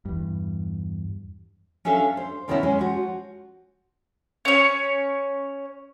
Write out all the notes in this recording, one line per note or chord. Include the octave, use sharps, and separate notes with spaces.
E2 G2
C#4 D4 A4 E5 F5
C5
B2 D#3 B3 C#4 D#4 E4
G#3 C#4
F3 F#4
C#4 C#5